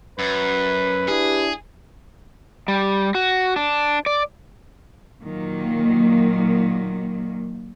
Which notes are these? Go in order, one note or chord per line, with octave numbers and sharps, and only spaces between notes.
F#2 B4
D4 E4 G4 G#4
G3
F#4
D4
D5
A#2 D#3 F#3 A#3